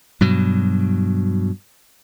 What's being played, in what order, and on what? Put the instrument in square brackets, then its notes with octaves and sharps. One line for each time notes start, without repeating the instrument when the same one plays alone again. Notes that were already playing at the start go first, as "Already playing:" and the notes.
[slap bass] G2 B2 F#3